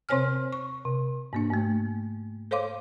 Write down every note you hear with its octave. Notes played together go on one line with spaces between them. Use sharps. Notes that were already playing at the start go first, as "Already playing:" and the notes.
C3 C4 C5 C#5 G#5 F6
C#6
C3
G#2 A#3 D4
G#2 A3
A4 C5 C#5 F5 C6 D6